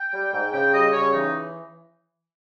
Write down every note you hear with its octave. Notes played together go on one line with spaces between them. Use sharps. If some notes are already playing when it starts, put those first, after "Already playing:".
Already playing: G5
G3
G#2
C#3 G5
G3 D#5
C#3 C#5
E3 D#4